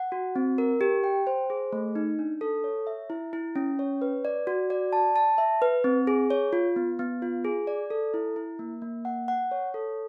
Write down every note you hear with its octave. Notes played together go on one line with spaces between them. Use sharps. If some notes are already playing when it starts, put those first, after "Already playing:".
Already playing: F#5
F#4
C4
A#4
G4
G5
C5
G#4
A3
D#4
D4
A4
C#5
E5
E4
E4
C#4
C#5
B4
D5
F#4
D5
A5
A5
E5
B4
C4
G#4
C#5
F4
B3
B3
F4
G#4
D5
A4
E4
E4
A#3
A#3
F#5
F#5
C#5
A4